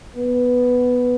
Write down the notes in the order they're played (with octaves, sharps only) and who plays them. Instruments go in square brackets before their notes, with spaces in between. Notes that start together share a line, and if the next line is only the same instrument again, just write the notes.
[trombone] B3